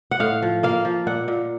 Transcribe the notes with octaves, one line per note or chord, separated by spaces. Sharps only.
F#5
A2 F5
F3
A#3 F5
F3
A#2 F#5
A#2